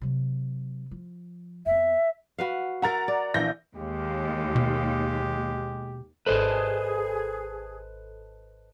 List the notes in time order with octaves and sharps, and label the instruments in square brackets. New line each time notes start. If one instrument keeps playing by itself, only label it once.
[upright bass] C3 F#3
F3
[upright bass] F2 B3 [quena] E5
[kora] F#4 B4 F5
[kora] A#4 E5 [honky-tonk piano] F#5 A#5 A6
[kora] D5
[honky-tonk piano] A#1 G6 A#6 [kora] E3
[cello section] D#2 [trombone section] G#3 G4
[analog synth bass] B2
[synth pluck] G#1 A4 [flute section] G#4 [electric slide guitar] B4 C5 D#5